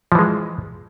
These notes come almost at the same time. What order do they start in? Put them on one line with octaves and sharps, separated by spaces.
F3 E3 G#3